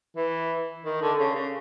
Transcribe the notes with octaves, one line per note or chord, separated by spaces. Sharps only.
E3
D#3
D3
C#3
C#3